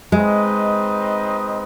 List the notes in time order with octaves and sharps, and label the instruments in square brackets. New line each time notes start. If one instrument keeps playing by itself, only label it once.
[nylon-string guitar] G#3 [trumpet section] C4 D#4 B4 D#5